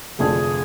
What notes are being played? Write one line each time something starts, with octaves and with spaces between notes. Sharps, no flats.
F1 F2 D3 F3 A3 G#4